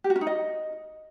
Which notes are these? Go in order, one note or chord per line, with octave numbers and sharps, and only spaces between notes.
G4
F#4
C#4
D#4
D#5